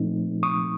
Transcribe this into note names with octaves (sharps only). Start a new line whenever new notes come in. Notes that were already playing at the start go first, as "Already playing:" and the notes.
Already playing: A#2 F3 A3 C4 D#4
C#6 D#6